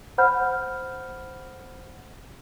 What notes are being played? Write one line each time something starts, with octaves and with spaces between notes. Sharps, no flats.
C5 F#5 B5 F6 G6